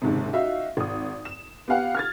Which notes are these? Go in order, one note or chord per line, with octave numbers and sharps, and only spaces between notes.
F#1 D#2 G#2 C3
D#4 F#4 E5 F5
G#1 D#6
E7
B3 G4 F5 F#5
F6 G#6 A6